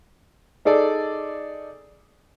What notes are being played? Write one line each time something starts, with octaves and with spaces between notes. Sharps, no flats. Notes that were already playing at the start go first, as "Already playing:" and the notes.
D#4 G#4 A4 D5